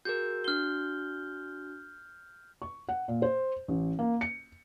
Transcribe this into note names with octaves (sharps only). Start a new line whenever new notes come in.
F#4 G#4 A#4 G6
D4 F#4 F6 G7
C#6
F#5
A#2
C5
A1
A#3
C#7